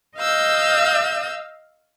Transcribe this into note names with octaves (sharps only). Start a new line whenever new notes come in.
D#5 F5 E6 G6